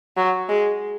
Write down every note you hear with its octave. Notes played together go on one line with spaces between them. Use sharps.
F#3
G#3